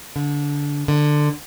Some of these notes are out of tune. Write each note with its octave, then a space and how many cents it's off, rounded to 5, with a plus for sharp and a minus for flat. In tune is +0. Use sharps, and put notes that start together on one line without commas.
D3 -20
D3 +15